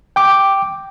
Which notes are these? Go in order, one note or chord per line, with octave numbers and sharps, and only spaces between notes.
G5 D6